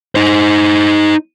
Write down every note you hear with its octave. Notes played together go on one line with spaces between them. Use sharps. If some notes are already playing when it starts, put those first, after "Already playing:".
D#4 C5